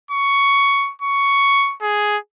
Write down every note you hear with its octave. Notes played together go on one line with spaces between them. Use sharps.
C#6
C#6
G#4